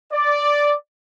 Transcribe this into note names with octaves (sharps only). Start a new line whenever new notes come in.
D5